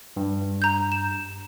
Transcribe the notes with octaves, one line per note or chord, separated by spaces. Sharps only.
G2
A#5 G6
E7